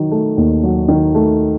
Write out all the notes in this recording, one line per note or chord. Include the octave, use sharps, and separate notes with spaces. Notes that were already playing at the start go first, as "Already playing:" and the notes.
Already playing: D#3 F#3
A3
D#2
F#3
D#3
A3